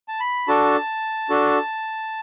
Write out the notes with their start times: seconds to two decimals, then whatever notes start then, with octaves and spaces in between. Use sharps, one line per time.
0.08 A5
0.20 B5
0.48 D4 F#4 A4 A5
1.30 D4 F#4 A4